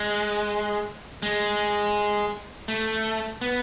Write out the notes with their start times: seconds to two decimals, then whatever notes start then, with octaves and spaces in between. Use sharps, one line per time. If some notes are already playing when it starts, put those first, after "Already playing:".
Already playing: G#3
1.22 G#3
2.68 A3
3.41 B3